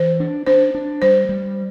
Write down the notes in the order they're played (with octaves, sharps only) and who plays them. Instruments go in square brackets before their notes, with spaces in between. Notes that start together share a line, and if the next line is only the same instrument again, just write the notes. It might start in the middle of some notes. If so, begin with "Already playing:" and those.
Already playing: [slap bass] E3 [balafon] C5
[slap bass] D4
[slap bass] D4 [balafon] C5
[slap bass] D4
[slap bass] G3 [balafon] C5
[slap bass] G3